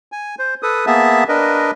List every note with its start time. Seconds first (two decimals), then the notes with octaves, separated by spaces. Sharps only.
0.12 G#5
0.39 C5
0.63 A4 B4 D#6
0.87 A#3 B3 G#4 E5 A5
1.28 D4 A#4 B4 D#5